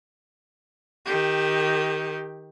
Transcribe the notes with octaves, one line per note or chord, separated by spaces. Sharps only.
D#3 G4